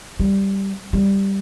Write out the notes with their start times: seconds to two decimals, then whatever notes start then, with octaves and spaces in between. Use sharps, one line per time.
0.19 G3
0.93 G3